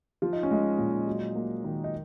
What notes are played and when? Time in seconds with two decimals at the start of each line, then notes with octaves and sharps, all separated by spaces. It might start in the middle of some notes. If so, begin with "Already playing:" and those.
0.22 F3 F4
0.33 D#4
0.43 C#4
0.51 G#3 D#4
0.78 A#2
1.07 F#3
1.35 A#3
1.64 D#3
1.84 D#4